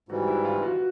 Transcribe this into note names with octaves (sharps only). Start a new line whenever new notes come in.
G#2 E3 G3 F#4
E4
F4
F#4